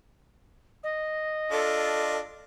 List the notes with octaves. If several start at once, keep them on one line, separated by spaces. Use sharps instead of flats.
D#5
D4 F4 A4